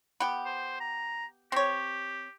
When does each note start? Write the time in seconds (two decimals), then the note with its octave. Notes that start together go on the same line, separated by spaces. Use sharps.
0.20 B3 G4
0.46 C5
0.81 A#5
1.52 C4 G4 C#5